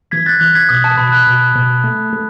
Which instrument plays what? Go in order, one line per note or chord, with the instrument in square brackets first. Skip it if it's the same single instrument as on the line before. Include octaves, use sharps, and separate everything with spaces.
[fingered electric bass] E3 [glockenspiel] G#6 B6
[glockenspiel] F#6 A6
[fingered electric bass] E3 [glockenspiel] F#6
[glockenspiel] G#6 B6
[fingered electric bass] B2 [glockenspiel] D#6
[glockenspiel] A5
[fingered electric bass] B2 [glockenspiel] B5
[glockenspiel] F#6
[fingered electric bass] B2
B2
A3
A3